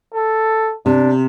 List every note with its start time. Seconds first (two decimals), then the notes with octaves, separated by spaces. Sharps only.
0.14 A4
0.86 C3 D4